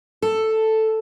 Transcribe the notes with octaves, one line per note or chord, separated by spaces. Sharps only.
A4